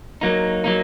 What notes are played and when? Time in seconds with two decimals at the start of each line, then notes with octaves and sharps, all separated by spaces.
0.21 F#3 A#3 D#4
0.64 F#3 A#3 D#4